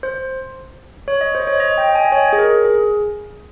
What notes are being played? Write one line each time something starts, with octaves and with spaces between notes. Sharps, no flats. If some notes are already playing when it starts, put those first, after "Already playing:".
C5
C#5
D#5
C5
D#5
C#5
D#5
G5
G5
G#5
D#5
C#5
G#4
A#4
G#4